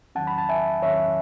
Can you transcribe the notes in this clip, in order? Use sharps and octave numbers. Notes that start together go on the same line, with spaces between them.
E2 D#3 F#3 C#4 F#5 A5
B5
A5
E5 G#5
E2 D#3 F#3 C#4 C#5 E5